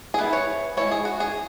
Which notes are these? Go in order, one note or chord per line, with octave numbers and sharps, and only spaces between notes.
G#4
E3 B3 E4 B4
C#5
G#3 C#4 E4 C#5
G#4
F#4
G#4